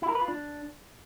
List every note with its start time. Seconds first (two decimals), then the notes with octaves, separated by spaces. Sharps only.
0.02 E4
0.09 A#4
0.15 B4
0.22 F4
0.28 D4